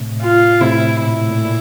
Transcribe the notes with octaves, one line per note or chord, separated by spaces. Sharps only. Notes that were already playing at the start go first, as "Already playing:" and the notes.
Already playing: A2 C3
F4
A2 C3 E4
A#2 E4
A2
A#2
A2
A#2